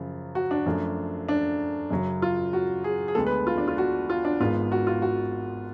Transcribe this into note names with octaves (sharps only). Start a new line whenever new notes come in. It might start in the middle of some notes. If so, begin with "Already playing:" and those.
Already playing: F#2 C#3 F3
F#4
D4
F#2 F3 A3
D4
F#2 C#3 F#3
F4
F#4
G#4
G#4
D2 D3 G#3 B3 A4
B4
F4
D4
F4
F#4
F4
D4
G#1 G#2 G#3 B3 F4
F#4
F4
F#4